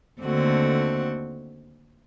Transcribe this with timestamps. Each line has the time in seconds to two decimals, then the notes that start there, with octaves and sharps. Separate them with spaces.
0.20 D#2 D3 A3 C4 F#4